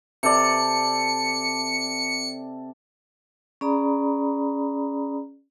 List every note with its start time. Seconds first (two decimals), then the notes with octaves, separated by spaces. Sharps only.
0.23 C3 A4 D5 C#7
3.61 C#4 G#4 D5 A#5 B5 D#6